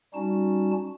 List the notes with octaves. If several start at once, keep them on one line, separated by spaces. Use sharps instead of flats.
G3 C#4 D#4 F#4 A5